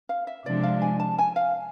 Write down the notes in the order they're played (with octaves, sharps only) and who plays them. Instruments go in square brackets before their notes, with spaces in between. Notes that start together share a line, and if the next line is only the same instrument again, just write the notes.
[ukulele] F5
E5
[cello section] C3 F3 G#3 D4 [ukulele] D5
[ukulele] F5
G#5
A5
G#5
F5